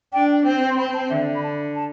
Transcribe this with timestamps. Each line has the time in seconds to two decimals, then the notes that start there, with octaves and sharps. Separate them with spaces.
0.13 D4 G5
0.45 C4 G5
0.70 C6
0.77 C4 B5
0.94 A5
1.10 D3 E5
1.35 B5
1.43 A5
1.75 A5